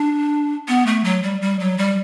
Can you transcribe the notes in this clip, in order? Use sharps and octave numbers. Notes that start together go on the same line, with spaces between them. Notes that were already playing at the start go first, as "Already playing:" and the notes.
Already playing: D4
B3
A3
F#3
G3
G3
F#3
G3